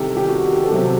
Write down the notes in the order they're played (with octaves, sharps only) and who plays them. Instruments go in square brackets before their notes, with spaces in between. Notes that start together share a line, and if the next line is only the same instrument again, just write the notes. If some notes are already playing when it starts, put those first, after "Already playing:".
Already playing: [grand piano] C2 C3 D#3 [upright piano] G4 A4
[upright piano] G4
F#4
A4
[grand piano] C3 F#3 C4 [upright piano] G4